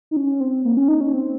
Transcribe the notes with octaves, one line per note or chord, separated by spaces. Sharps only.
D#4
C#4
C4
A#3
C#4
D#4
C#4
C4